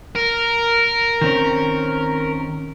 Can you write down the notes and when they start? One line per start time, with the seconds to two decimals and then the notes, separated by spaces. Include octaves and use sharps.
0.15 A#4
1.21 D#3 C4 C#4